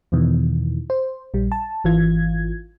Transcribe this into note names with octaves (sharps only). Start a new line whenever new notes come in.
E2 B2 D#3 E3
C5
A#1 G3
A5
G#1 E3 F4 G#6